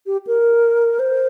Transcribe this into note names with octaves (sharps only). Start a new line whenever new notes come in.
G4
A#4
C5